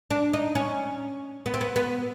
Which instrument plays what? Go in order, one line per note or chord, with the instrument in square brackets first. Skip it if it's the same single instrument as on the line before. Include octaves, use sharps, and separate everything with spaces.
[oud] D4
D#4
C#4
B3
C4
B3
B3